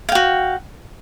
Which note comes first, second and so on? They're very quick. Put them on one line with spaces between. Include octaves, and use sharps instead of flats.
F5 G5 F#4